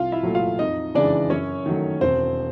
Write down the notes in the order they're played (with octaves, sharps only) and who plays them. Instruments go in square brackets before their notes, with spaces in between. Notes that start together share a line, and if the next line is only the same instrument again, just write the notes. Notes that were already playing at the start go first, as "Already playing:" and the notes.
Already playing: [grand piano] C2 F4 F5
E4 E5
A#2 F#3 A3
F4 F5
F2 D#4 D#5
C#3 E3 G#3 D4 D5
F#2 C#4 C#5
D#3 F#3 A3
E1 C4 C5